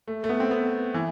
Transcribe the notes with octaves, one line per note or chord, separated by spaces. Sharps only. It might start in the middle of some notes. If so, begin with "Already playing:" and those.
A3
A3
B3
C4
B3
E3